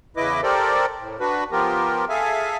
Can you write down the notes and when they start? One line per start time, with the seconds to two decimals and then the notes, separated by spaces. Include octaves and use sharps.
0.17 E2 C#3 E4 B4 D#5 D6
0.43 G4 A4 A#4 C5 D5
0.99 A2
1.20 D4 F#4 B4
1.52 F3 B3 F4 G4 A#4
2.09 G#4 A4 E5 F5 G#5